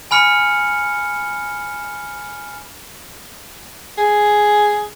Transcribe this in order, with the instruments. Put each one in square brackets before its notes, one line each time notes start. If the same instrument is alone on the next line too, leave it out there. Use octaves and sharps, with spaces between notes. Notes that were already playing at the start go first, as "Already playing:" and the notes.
[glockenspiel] G#5 B5 F6 C#7
[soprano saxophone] G#4